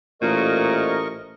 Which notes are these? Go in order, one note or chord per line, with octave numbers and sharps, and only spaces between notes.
A1 A#2 A3 A#4 C5 D#5 C#6